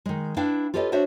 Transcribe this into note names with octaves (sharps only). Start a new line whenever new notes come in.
D#3 G#3
D4 E4 B4 F5 G5
F4 G4 A4 B4 C#5 D#5
D4 F#4 C5 C#5 E5